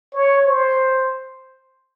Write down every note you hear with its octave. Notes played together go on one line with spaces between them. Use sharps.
C#5
C5